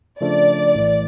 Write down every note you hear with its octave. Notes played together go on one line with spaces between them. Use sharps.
C#3 F3 A3 D4 D5
A#1 A2 E3 A3